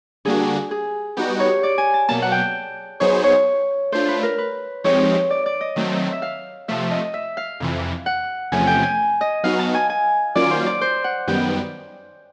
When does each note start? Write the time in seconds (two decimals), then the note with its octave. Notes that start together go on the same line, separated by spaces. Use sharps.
0.25 D3 G3 A#3 D4 F#4 G#4
0.71 G#4
1.17 G3 B3 D#4 F#4 G4
1.40 C#5
1.63 D5
1.78 G#5
1.94 A5
2.09 B2 F#3 A#3 A5
2.22 F#5
2.32 G5
3.00 F#3 B3 D#4 G#4 C5 C#5
3.24 C#5
3.92 A3 D4 F4 C5
4.08 B4
4.23 A#4
4.38 B4
4.84 F3 G#3 C4 D#4 G4 C#5
5.30 D5
5.46 D5
5.61 D#5
5.76 D#3 F#3 A3 C4
6.12 E5
6.22 F5
6.68 C3 F3 A3 E5
6.91 D#5
7.14 E5
7.37 F5
7.60 F2 C3 E3
8.06 F#5
8.52 E2 C3 F3 A3 C#4 G#5
8.67 G5
8.83 G#5
9.21 D#5
9.44 F#3 B3 D#4 F#4 F5
9.59 A5
9.74 G#5
9.90 G#5
10.35 D#3 F#3 A#3 C#4 F4 D5
10.51 C5
10.66 D5
10.81 C5
11.04 F#5
11.27 F#2 D#3 G3 B3 G5